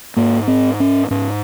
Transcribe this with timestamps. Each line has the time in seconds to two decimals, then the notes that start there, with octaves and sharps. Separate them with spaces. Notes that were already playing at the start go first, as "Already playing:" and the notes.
0.16 G#2 A#3
0.48 C4
0.80 C#4
1.10 G#2 C#4